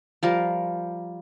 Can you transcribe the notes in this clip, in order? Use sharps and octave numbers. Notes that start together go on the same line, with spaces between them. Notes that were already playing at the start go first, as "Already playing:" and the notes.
F3 G3 A#4